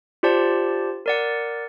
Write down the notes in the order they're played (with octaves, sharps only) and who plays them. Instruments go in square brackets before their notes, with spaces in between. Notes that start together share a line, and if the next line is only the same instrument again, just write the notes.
[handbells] F4 G4 C5 D5 A5
A#4 D5 F#5